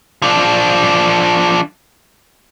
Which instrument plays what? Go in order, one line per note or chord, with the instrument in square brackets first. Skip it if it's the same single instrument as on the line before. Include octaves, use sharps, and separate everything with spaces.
[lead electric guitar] F3 D4